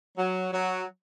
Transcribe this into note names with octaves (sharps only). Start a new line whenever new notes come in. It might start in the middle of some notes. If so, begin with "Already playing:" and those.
F#3
F#3